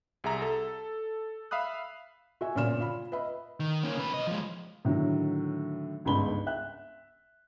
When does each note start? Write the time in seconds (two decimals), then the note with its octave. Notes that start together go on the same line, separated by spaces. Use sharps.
0.24 C2 G#4 E5 A#5
0.42 A4
1.51 E5 F5 B5 D#6 F#6
2.41 F#4 E5 G#5
2.55 G1 A#2 C#3 F6 E7
2.79 F4 B5
3.12 B4 D#5 E5 B5
3.60 D#3
3.84 A#3 C#4
3.97 C#3 B4
4.14 B1 D#5
4.27 F3 G#3
4.85 A2 D3 D#3 F#3
6.05 G1 C#2 G#2 D4 B5 G7
6.47 E5 F#6